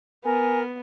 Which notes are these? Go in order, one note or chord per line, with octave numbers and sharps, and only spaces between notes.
B3 A#4 G#5